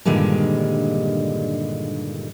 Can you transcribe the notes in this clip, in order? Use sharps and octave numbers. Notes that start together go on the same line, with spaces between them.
G2 A#2 D3 D#3 G3 G#3